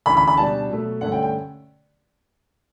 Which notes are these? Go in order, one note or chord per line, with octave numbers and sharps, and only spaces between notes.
D2 C#3 E3 B5
B5
B5
B2 G3 D4 A5
B2 F#3 A3
G2 D3 A3 C#4 F#5
G5
G5